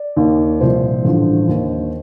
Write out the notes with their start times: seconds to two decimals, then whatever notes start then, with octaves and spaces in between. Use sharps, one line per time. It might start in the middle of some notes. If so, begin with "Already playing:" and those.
Already playing: D5
0.17 D#2 D#3
0.60 C2 A#2 F3 C5
1.05 A1 G2 D3 F3
1.48 D#2 D#3